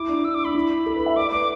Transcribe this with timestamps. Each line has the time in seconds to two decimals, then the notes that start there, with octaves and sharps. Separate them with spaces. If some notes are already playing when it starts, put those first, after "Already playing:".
Already playing: E4 D6
0.09 D4
0.24 D4 E6
0.35 D6
0.45 D4 B5
0.55 E4
0.86 A4
0.96 B4
1.06 E5
1.16 D5 D6
1.32 B4 D6